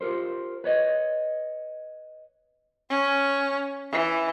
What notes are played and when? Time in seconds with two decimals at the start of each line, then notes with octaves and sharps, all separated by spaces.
0.01 F4 G4 A#4 C5
0.64 B4 C#5 D#5
2.90 C#4
3.92 E3